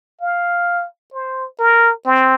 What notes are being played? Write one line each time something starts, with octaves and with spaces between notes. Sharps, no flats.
F5
C5
A#4
C4